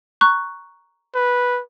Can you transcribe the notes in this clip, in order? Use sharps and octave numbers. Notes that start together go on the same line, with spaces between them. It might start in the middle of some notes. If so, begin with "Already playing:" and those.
A#5 C#6 F#6
B4